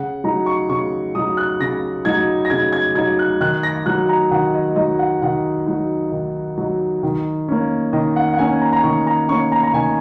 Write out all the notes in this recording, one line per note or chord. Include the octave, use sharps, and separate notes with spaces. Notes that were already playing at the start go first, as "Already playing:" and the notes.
Already playing: C#3 F#5
F#3 D#4 A#5
C#6
C#3 C#6
F#3 D#4 D#6
F#6
C#3 A#6
F#3 D#4 G#6
A#6
C#3 G#6
G#6
F#3 D#4 G#6
F#6
D#3 F#6
A#6
F#3 D#4 F#6
A#5
D#3 F#5
D#5
F#3 D#4 D#5
F#5
D#3 F#5
F#3 D#4
D#3
F#3 D#4
D#3
A#3 C#4
D#3 D#5
F#5
F#5
A#3 C#4 G#5
A#5
A#5
D#3 C#6
A#5
A#3 C#4 C#6
A#5
A#5
D#3 G#5